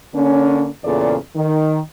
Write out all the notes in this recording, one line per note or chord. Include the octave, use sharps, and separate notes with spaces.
D3 A#3 C#4
E2 A#2 C#3 A4 D5
D#3